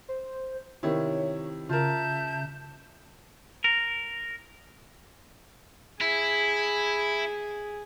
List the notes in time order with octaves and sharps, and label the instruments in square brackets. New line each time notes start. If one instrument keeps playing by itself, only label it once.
[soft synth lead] C5
[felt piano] C3 D#3 E4 [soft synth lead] C#5
[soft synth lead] C#3 [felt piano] F4 A#4 [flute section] E5 A5 G6
[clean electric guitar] A#4
[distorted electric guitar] E4 [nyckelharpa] G#4